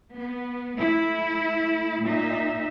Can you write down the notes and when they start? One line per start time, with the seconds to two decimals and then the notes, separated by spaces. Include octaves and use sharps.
0.15 B3
0.79 A3 E4
2.04 A#2 D#4 E5